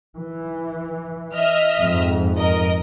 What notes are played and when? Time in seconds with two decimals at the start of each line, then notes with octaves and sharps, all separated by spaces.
0.16 E3
1.34 D#5 E5 F6
1.78 F2 G#2
2.37 A#4 D#5